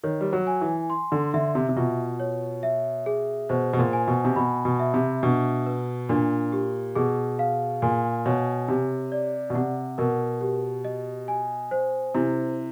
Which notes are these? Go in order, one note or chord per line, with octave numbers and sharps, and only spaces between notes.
D#3 C#5
G3
F#3
G#5
E3
C6
D3
D3 E5
C3
C3
B2 F4
C#5
E5
G#4
B2 C5
B2
A#2
G#5
B2
C3
B2 B5
B2
E5
C3
B2 D4
B4
A#2 D4
G4
B2 G#4
F5
A#2 G#5
B2 C#5
C3 G4
D5
B2
C3 F#5
B2 A#4
G4
D#5
G#5
C5
C3 E4